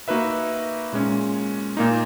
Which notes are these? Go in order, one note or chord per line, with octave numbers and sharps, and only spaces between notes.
A#3 D#4 F#4 B4 E5
A#2 G#3 C#4
A#2 A#3 D#4